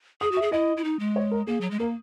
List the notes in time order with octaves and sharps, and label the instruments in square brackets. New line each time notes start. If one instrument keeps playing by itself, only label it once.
[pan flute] G#4 [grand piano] D#6
[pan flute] F#4
[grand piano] E5
[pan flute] G#4
[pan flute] E4 [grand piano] D#5
[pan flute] E4
D#4
G#3
[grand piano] C#5
A#4
[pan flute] A#3 [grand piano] G#4
[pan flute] F#3
G#3
[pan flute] A#3 [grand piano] A#4